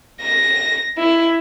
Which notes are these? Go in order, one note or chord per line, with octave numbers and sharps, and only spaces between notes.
A#6
E4